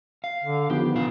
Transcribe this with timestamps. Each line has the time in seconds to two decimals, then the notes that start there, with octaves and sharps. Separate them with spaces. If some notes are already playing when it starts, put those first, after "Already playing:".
0.24 F5
0.44 D3
0.70 D3 D#3 F3 B3 G4
0.95 B2 F5